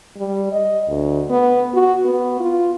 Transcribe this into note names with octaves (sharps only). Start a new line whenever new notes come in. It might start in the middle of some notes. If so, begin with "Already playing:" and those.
G3
D#5
D2
B3
F#4
B3
F4